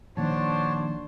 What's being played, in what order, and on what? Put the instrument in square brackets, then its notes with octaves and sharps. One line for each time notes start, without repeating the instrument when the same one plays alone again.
[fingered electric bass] A#1 D#3 A#3 [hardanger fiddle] D4 C5 [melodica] F#4 C#5 A5